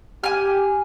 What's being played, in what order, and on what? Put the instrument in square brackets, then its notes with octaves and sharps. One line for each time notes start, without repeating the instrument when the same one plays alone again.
[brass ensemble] G4 [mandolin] G#5 F6